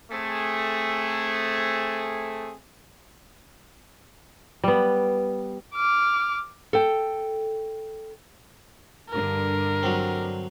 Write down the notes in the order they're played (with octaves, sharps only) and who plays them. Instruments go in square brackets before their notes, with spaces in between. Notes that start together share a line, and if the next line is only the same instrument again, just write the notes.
[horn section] A3 C4 G#4
[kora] G3 B3
[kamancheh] D6 F6
[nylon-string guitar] A4 G5
[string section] G2 D3 [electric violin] A#4
[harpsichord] F#3 C4